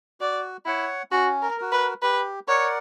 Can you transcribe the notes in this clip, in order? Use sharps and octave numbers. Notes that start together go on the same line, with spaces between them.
F#4 D5
E4 C#5 F#5
C#4 F#4
A#4
F#4 A#4
B4
G4 B4
A#4 C#5 D5 F#5